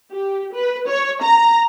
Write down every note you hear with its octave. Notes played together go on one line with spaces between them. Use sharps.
G4
B4
C#5
A#5